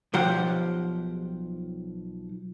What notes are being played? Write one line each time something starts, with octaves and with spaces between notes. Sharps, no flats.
B1 F3 G4 F#5